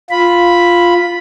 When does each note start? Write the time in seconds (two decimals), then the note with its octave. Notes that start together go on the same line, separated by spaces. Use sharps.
0.10 F4 B5